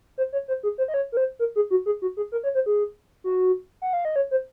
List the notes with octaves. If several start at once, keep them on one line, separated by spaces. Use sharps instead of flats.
C5
C#5
C5
G#4
C5
D#5
C#5
A#4
C5
A#4
G#4
F#4
G#4
F#4
G#4
A#4
C#5
C5
G#4
F#4
F#5
F5
D#5
C#5
C5